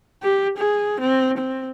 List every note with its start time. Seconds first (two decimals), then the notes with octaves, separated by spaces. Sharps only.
0.23 G4
0.57 G#4
1.00 C4
1.38 C4